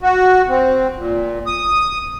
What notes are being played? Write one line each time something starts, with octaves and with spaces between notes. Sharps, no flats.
F#4
C4
A#2
D#6